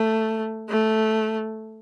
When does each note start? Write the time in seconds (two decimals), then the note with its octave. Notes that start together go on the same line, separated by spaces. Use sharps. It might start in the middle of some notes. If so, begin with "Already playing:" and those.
Already playing: A3
0.69 A3